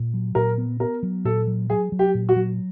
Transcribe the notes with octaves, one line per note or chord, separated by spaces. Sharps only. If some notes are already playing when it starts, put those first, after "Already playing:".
Already playing: A#2
F#3
A#2 A#4
B3
B3 A#4
F#3
A#2 A4
F#3
F#3 G#4
F#3
G4
A#2
F#4
F#3